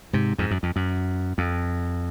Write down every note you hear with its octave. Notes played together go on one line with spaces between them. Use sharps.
G#2 C3
F2 G#2
F#2
F2
F#2
F2